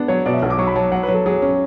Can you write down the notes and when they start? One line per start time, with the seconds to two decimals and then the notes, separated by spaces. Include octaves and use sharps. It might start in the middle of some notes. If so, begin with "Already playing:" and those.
Already playing: B3 D4
0.08 F#3 C#5
0.25 B2 D5
0.33 E5
0.42 B1 F#5
0.50 D6
0.59 F#3 C#6
0.67 B5
0.75 F#3 A5
0.92 F#3 F#5
1.03 B4
1.08 F#3
1.14 A4
1.26 F#3 G#4
1.42 C#4